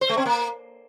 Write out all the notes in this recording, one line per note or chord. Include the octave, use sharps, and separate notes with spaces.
C5
A3
C4
A#3